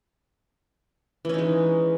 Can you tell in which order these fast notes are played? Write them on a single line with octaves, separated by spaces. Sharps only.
E3 C#4 D#4 G#3